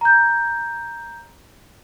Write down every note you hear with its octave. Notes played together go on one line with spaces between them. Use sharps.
A#5 G6